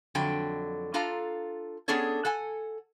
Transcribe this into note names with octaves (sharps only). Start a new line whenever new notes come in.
F2 D3 F#3 G5
D4 F4 A4 F5 A#5
B3 C#4 D4 G#4 A4 C#5
A4 F#5 G#5